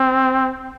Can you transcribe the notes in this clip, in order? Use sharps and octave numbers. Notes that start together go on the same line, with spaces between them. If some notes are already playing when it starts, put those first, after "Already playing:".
Already playing: C4